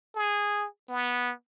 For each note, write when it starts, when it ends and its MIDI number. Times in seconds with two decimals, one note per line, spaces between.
0.15 0.67 68
0.89 1.32 59